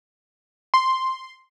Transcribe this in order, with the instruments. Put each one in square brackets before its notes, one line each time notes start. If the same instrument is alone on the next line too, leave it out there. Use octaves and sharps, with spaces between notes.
[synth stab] C6